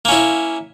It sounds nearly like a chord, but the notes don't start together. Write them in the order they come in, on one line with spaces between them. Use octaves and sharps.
A#3 C#4 E4